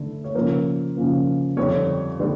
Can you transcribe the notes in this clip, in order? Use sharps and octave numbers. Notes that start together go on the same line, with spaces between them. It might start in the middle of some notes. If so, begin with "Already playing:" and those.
Already playing: D3 A3 E4
C#5
C#3 F3 A#3 A#4
C#3 F3 A#3
F2 D3 G3 C#5
D3 G3